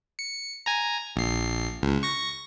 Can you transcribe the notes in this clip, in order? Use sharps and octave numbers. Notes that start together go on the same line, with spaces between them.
C#7
G#5 A#5
A#1 C7
C#2
C#6 A#6